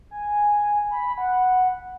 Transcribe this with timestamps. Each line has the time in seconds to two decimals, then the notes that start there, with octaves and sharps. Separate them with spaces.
0.11 G#5
0.91 B5
1.18 F#5